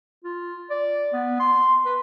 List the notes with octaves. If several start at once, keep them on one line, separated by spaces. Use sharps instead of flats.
F4
D5
B3
C6
B4